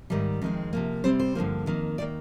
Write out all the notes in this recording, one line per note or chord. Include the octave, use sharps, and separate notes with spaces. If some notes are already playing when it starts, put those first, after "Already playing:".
G#2 D#3 G3
F2 D#3 G#3 C4
C3 F3 A#3
C3 G3 C4 C5
C5
G2 D3 F3 A#3
F2 D#3 A#3
D#3 A#3 D5